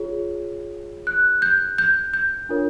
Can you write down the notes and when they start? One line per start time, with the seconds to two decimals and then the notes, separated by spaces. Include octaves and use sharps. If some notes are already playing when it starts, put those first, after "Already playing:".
Already playing: F4 G#4 C#5
1.07 F#6
1.42 G6
1.78 G6
2.13 G6
2.49 D4 F4 A#4 C#5